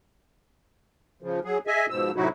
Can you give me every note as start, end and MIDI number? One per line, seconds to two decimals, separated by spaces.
1.22 1.40 49
1.22 1.40 53
1.45 1.58 54
1.45 1.58 68
1.67 1.86 68
1.67 1.86 75
1.67 1.86 76
1.67 1.86 80
1.90 2.12 44
1.90 2.12 47
1.90 2.12 53
1.90 2.12 88
2.16 2.28 45
2.16 2.28 48
2.16 2.28 54
2.16 2.28 63
2.16 2.28 64
2.16 2.28 66